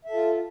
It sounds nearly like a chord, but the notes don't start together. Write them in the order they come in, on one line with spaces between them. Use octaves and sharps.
E5 A4 F4